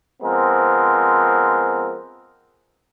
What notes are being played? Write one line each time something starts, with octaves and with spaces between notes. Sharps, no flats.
F3 G#3 B3 C4 A#4